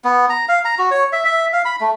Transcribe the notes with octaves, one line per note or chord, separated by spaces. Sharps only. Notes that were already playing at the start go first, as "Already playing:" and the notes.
B3
A#5
F5
A#5
F#4
C#5
E5
E5
F5
B5
A3